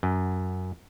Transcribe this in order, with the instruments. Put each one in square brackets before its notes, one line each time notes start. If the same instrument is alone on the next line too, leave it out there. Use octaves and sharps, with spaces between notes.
[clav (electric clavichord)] F#2